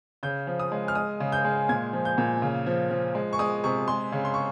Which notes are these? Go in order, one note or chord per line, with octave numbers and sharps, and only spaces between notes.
C#3 G6
F3
D#6
G#3
F6
G#3 D#6
C#3
G6
G#3
A#2 G#6
F3
G6
A#2
C#3
F3
F3
G#3
C#6
G#3 D#6
C3 C#6
G#3 C6
C#3
C6
C#6